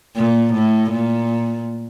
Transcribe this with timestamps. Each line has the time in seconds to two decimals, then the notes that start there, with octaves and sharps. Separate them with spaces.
0.16 A#2
0.53 A2
0.90 A#2